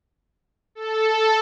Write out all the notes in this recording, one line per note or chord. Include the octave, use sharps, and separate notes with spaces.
A4